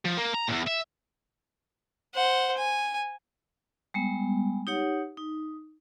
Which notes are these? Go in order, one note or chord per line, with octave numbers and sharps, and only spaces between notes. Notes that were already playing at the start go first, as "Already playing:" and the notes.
F3
A#3
A#5
E2 A#2
E5
C5 F#5
G#5
G3 G#3 B3
D#4 G4 C#5 F#5
D#4